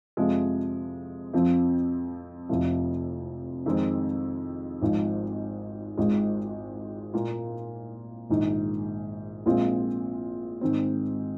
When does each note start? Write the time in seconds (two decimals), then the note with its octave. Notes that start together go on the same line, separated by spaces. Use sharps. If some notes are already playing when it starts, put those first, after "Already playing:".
0.17 F2 C3 F3 G#3
1.33 F2 F3 C4
2.49 F1 F2 C3 F3
3.66 F2 D#3 G#3 C4
4.82 G#1 G#2 F3
5.97 G#1 G#2 G#3 F4
7.14 A#2 A#3 F4
8.30 A#1 G#2 D#3
9.46 A#1 A#2 G#3 C4 F4
10.61 G#2 D#3 C4